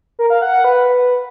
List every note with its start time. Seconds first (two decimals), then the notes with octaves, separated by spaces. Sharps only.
0.19 A#4
0.30 F5
0.42 F#5
0.53 F#5
0.64 B4